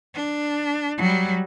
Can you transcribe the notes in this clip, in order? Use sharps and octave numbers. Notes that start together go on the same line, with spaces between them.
D4
F#3 G3